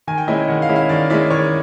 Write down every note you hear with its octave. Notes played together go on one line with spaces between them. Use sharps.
D#3 G#5
G5
G#3 C#4 E4 D#5
D#3 F#5
F5
G#3 C#4 E4
F5
D#3 D5
G#3 C#4 E4 D5
D#3 C#5